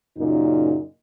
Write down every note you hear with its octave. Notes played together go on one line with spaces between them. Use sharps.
F#2 A#2 C#3 D#4